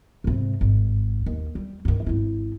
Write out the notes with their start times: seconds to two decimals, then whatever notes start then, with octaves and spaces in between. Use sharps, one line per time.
0.24 G#2 C3
0.61 G#1
1.26 D#2
1.55 G3
1.85 G2 D#3
2.06 G#1 E4